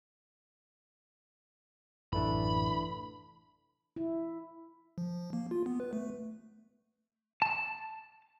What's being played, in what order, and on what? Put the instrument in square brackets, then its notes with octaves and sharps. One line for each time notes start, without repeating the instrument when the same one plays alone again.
[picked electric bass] A1 F#2 C3 [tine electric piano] E3 A3 D4 [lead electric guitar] B5
[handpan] E4
[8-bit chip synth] F3
A#3
F4
B3
B4
A3
[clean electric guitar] A5